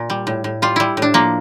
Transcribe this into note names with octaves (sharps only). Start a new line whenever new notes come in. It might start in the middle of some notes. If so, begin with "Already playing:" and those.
Already playing: A#2
G3
A2
A2
G3 F4
G3 E4
A2
D4
F3 A#3